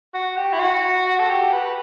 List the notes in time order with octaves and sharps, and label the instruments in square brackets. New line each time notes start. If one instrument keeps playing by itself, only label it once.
[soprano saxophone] F#4
G4
E4
F#4
A4
G4
B4